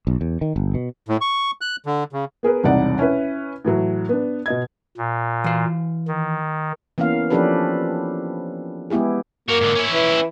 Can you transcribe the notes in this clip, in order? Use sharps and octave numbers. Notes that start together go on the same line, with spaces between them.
B1
E2
D#3
G1
B2
A2
C#6
F#6
D3
C#3
B3 G#4 A#4 B4
E1 C2 C3 D#4 D5 F#5
C#4 E4 B4
A2 E3 F#3
B3 D4
B2 D#5 G#6
A#2
E3 F5
D#3
E3 A#3 B3 C#4 F5
F3 C#4 D4 G4 A4 B4
G#3 B3 E4 G4 G#4
A#3 F#4 A#4
G#2 D3
C#4 E4
E3